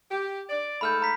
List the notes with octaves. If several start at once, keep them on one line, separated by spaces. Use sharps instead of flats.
G4
D5
G#2 A3 A4 B5 F6 G6
A#5 B6